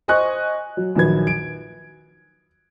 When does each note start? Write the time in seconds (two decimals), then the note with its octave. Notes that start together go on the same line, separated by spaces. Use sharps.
0.08 C5 D#5 G#5 C#6 F#6
0.77 F#3
0.95 A#1 D#3 F#3 B4 G#6
1.27 D7